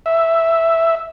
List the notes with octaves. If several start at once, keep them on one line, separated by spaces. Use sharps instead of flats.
E5